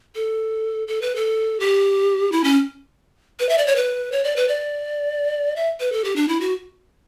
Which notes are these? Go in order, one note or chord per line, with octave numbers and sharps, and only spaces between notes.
A4
A4
B4
A4
G4
E4
C#4
B4
E5
D5
C#5
B4
C#5
D5
B4
D5
E5
B4
A4
G4
D4
E4
F#4